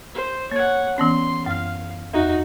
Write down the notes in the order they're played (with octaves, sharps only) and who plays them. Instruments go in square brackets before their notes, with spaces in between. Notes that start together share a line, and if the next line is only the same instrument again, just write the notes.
[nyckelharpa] C5
[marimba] A#3 G#6 [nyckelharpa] C#5 F#5
[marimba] E3 B3 C#4 [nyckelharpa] C6
[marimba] F#2 F6 [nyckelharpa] F5
[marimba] E2 [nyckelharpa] D#4 F#4